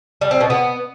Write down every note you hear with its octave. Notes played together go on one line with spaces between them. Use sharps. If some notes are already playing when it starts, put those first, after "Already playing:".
G3
C4
B2
B3